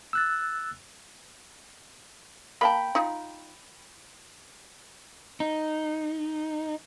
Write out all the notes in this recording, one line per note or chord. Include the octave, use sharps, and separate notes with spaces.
E6 F#6 A6
A#3 F5 G5 A5 B5
D#4 F4
D#4